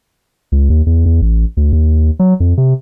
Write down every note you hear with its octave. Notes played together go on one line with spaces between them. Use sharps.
C#2
D#2
E2
E2
A1
D2
D#2
F#3
F2
C3